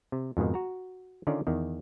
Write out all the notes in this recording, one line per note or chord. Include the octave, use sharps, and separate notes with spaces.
C3
F2 G#2 B2 D#3
F#4 A#5
D3 D#3 C#4 F4 A#4 D5
E2 D#3